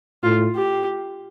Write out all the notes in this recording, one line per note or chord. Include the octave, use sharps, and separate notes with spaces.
A2 F4
G4